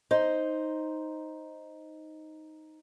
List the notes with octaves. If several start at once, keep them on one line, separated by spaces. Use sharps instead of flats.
D#4 C5